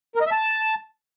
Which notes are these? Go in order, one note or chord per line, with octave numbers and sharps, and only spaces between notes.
A#4
D#5
E5
A5